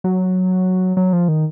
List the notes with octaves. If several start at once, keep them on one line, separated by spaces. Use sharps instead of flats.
F#3
F#3
F3
D#3